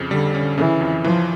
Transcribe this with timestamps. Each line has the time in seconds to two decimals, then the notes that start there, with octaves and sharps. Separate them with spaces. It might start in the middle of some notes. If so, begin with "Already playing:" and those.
Already playing: F2 C#3
0.11 D3 G3
0.34 C#4
0.58 C#3 E3
0.81 F2
1.04 E3 F3